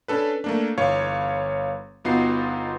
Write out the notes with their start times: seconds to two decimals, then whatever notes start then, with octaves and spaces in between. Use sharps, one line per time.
0.08 C#4 D4 A4 B4
0.44 A3 A#3 D4
0.78 G1 E3 C#5 F5 C#6
2.05 G1 B3 D#4 F4 F#4 C7